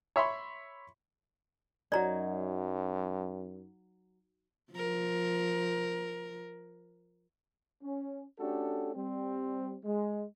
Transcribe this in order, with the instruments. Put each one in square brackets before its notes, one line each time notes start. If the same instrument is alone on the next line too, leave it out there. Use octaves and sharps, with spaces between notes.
[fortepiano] C#5 E5 B5 C6
[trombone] F#2 [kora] F#3 D#4 [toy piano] D5 A#5
[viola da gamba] F3 A#4
[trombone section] C#4
A3 C#4 D4 F#4 G4 A4
G3 C4
G#3